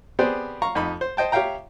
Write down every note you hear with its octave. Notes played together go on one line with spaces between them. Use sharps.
B3 C4 G4 G#4 C5 D5
F5 A#5 C#6
F2 D#4 B5
C5
C5 D#5 G5 A5
G4 C#5 E5 F5 G5 A#5